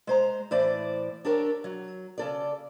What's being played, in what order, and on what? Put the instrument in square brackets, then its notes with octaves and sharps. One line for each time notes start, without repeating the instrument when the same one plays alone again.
[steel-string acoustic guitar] G#3 C5 A#5
A2 E3 C5 D5
D4 G4 A4 A#4 C#5
F#3
C#3 A4 D5